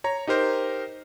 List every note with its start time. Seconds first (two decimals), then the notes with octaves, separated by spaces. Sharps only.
0.04 C#5 A#5
0.27 D#4 G4 A#4 C5